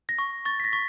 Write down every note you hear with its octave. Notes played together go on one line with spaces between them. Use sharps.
A#6
C#6
C#6 A6
B6
A#6
C#6 B6